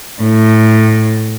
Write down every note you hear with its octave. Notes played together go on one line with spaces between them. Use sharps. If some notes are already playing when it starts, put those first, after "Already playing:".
A2